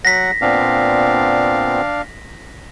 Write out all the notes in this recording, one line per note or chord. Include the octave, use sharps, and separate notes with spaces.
F#3 F#5 A#6 B6
A#2 B3 C4 D4 F5